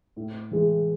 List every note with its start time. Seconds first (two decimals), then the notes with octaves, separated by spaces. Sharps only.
0.16 A2
0.51 E3 G#3